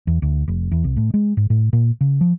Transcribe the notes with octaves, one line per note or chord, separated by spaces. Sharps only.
E2
D2
F1
E2
C2
A2
G#3
G#2
A2
A#2
C#3
F3